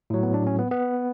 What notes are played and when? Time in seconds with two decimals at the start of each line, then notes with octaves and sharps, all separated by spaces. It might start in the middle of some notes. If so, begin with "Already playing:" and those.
0.10 A2 F#3
0.23 B3
0.34 D4
0.47 C#4
0.59 B3
0.71 B3